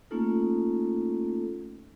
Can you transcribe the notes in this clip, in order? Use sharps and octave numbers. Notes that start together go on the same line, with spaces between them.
A3 A#3 C#4 D#4 F4 A4